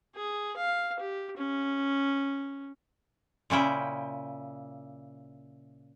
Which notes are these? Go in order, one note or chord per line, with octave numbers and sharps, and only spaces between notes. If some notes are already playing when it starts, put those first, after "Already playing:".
G#4
F5
G4
C#4
A#2 C#3 E4 G5